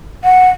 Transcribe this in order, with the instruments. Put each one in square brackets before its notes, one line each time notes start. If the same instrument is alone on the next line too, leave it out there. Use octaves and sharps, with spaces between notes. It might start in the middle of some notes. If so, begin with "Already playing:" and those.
[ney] F#5